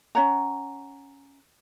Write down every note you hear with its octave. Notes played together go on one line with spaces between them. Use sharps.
C#4 C#5 F#5 A#5